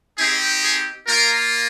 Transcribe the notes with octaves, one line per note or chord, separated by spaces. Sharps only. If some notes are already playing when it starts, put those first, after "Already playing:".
C4 D#4 G4 G#4
G#4
A#3 F4 A#4